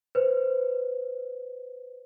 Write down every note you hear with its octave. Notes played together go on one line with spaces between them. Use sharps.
B4 C5